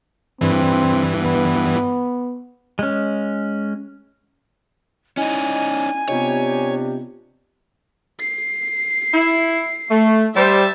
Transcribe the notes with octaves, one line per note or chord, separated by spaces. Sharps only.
G2 E3 C4
B3
G#3 C#4
C#4 D#4 E4 D#5 G#5
C3 B3 D4 F4 G4 C#5 D#5
C7
E4
A3
G3 C5 E5 A5